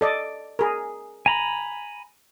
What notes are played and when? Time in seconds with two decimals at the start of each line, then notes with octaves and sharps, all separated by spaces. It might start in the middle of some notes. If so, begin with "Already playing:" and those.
0.01 A4 D5 D#5
0.59 G#4 A#4
1.26 G#5 A#5 B5